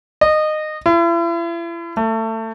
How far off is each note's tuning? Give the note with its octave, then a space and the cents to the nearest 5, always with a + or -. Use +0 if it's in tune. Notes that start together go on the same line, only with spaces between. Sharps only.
D#5 -20
E4 +40
A3 +25